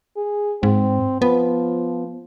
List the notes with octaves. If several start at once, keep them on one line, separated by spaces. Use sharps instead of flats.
G#4
G#2 C4
F3 B3